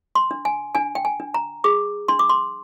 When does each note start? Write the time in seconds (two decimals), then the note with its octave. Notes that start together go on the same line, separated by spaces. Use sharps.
0.15 C6
0.31 D4
0.45 G#5
0.75 D4 G#5
0.95 G5
1.05 G#5
1.20 D4
1.34 A#5
1.64 G#4 D6
2.08 D4 C6
2.19 D6
2.29 C6